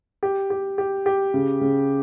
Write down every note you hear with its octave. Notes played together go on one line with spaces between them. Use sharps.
G4
G4
G4
G4
C#3
C#3